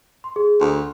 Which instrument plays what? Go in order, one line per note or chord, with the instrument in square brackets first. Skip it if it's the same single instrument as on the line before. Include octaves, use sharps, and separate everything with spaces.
[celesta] C6
G#4
[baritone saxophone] D2 [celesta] C6